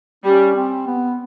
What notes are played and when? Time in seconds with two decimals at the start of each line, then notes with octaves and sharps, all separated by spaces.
0.24 G3 C#4
0.56 C4
0.87 B3